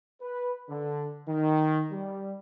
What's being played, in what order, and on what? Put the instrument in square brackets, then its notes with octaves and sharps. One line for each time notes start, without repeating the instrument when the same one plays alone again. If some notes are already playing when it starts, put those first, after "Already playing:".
[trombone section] B4
D3
D#3
G3